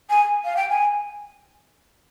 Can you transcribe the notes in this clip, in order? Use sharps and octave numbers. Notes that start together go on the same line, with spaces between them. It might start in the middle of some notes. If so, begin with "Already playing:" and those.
G#5
F5
G5
G#5